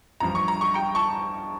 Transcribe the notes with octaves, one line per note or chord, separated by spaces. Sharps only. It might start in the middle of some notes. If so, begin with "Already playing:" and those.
A1 G2 F3 A#5
C#6
A#5
C#6
G5 A#5
A5 C#6